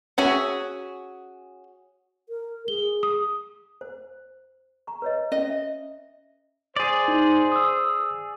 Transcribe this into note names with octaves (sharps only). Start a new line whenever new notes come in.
C#4 F#4 G#4 E5
A#4
G#4 G7
D#6
C5
A#5 C#6
B4 C#5 D#5
C#4 D#5
E5
G#4 C5 D5
D#4
D#6 E6